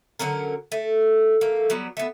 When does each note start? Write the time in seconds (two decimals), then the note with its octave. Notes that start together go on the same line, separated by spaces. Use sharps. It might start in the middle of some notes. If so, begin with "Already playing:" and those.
0.19 D3 F#3 C#4 A#4
0.72 A3
1.41 A3 A#3
1.70 F#3 G3 B3
1.97 A3 B3